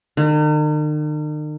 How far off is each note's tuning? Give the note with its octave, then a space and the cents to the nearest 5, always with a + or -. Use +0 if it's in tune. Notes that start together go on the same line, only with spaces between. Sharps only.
D#3 -45